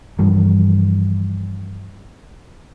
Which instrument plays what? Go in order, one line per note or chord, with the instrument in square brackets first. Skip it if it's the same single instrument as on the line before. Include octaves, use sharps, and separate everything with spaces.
[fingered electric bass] G2 E3 F3 G3